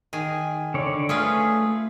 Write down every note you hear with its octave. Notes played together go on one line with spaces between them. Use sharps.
D#3 G#4
D3 C#5 D5
A3 C#4 F4 G#4 B4 D#6